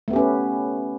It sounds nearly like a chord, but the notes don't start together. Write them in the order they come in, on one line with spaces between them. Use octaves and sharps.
A3 B3 G4 C#4 B4